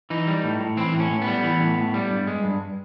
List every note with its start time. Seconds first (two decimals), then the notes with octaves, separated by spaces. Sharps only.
0.10 E3 D#4
0.27 G3
0.44 A2
0.61 A2
0.77 E3 C4
0.94 A2
1.00 C#4
1.11 A2
1.22 B3
1.27 G3
1.44 E3
1.60 A2
1.78 A2
1.94 G3
2.11 G2
2.27 G#3
2.44 G2